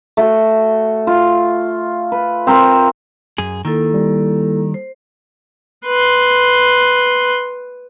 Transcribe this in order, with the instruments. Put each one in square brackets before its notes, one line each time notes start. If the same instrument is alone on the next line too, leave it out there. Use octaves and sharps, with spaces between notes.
[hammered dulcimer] A3 F#4
F4
B4
C4 A#4 C5
[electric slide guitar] F#2 G#4
[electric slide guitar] D#3 [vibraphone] A#3 E4 A4
[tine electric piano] G3
[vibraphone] C5
[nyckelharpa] B4 C6